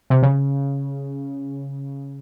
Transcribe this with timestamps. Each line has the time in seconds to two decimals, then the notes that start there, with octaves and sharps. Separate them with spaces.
0.10 C3
0.23 C#3